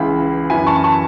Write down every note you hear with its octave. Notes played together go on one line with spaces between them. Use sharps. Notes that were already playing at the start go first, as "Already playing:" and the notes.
Already playing: C#2 C#3 E3 B5
F#2 E3 G#5 B5
A5 C#6
A5 C#6